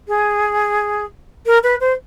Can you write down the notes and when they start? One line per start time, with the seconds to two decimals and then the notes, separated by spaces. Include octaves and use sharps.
0.08 G#4
1.46 A#4
1.63 B4
1.81 C5